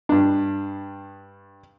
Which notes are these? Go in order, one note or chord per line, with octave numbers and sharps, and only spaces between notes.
G2 D4